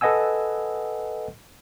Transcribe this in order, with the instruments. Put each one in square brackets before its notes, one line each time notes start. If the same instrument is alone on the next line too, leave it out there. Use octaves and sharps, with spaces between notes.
[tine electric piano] A4 B4 D#5 F#5 G#5 E6